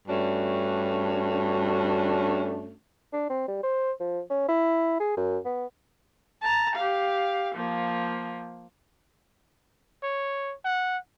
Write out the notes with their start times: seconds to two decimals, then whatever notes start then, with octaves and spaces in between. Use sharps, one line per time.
0.08 G2 A3 C#4 D4 F#4
3.13 D4
3.30 C4
3.48 G3
3.63 C5
4.00 F3
4.30 C#4
4.48 E4
5.00 G#4
5.17 F#2
5.45 B3
6.42 A5 A#5
6.76 G4 F5
7.55 F3 A#3
10.03 C#5
10.65 F#5